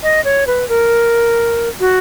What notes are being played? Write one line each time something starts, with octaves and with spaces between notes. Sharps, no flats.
D#5
C#5
B4
A#4
F#4